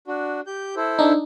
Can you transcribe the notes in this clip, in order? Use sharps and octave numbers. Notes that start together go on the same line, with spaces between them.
D4 F#4
G4 G6
E4 A4 C5
D4 D#4